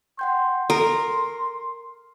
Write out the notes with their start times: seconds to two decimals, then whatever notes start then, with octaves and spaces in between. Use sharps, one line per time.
0.19 F#5 G5 C6 G6
0.70 A4 A#4 C7